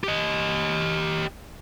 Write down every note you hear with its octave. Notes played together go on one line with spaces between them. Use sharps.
G4 D#5